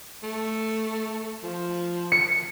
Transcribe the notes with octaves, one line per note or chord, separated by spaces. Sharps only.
A3
F3
C#7